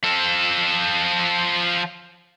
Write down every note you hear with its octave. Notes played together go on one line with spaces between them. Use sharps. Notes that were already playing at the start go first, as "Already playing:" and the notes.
F3 A4